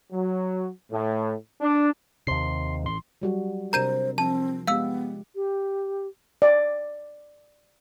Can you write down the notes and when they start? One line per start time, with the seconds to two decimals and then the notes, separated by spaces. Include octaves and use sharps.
0.11 F#3
0.91 A2
1.61 D4
2.27 D#2 C3 C6 C7
2.83 A1 C6
3.22 F#3 G3 F#4
3.73 C3 D4 A#4 C5 A#5 G6 D#7
4.18 F3 C4 A5
4.67 G#3 B3 G4 F5 E6
5.35 G4
6.42 D5